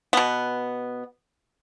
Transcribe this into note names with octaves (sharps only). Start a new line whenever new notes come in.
B2 B3